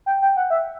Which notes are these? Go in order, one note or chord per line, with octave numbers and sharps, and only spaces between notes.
G5
G5
F#5
E5